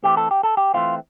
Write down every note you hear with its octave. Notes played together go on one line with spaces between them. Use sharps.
E3 A3 C4 G4
A4
G4
A4
G4
E3 A3 C4 F4